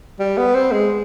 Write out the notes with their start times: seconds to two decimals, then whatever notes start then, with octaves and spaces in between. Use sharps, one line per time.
0.20 G3
0.37 B3
0.54 C4
0.72 G#3